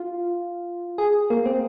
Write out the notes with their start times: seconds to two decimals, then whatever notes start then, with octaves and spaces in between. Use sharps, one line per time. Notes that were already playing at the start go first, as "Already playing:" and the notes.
Already playing: F4
0.98 G#4
1.30 A#3
1.46 C4